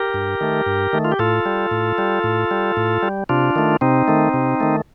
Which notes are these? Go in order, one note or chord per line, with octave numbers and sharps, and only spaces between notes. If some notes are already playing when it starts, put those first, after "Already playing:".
Already playing: G4 A#4
G2
D#3 A3
G2
D#3 A3
F4
G4
A2 F4 A4
G3
A2
G3
A2
G3
A2
G3
C3 D4 F4
D#3 A3
C3 C4 D#4
D#3 A3
C3
D#3 A3